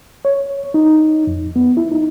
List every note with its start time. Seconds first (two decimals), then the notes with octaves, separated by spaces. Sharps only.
0.25 C#5
0.74 D#4
1.27 F2
1.56 B3
1.77 E4
1.92 D#4